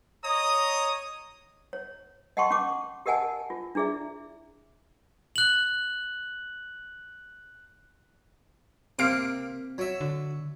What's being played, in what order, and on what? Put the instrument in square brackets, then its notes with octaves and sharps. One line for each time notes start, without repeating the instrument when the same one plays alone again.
[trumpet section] C#5 D#5 A#5 D#6
[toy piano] C#5
D#5 F#5 G5 A5 C6 C#6
C#4 F#5 C#6 D6
G4 A#4 D#5 F#5 G#5 A5
F4
D4 E4 G#4 D5 E5
[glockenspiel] F#6 F#7
[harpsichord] C3 A#3 [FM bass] C4 [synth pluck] F5 D7
[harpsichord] F#3 E5
[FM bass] D3